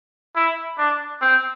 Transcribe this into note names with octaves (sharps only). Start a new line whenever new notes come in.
E4
D4
C4